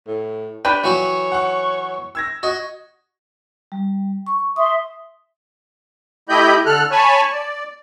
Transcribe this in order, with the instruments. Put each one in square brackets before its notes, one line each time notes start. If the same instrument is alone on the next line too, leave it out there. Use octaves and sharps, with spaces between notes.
[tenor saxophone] A2
[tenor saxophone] D4 [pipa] G4 B4 G5 [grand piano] D#7
[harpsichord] E3 F#3 F#4 [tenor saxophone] C#5
[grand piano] F#5 C#6
E6 G#6 A#6
[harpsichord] F#4 [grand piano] D#5
[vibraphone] G3
C#6
[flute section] E5 C6 [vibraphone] D#6
[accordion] A3 E4 G4 D#5 B5 G6
D3 A4 F6 F#6
C#5 G#5 A5 B5 C#6
D5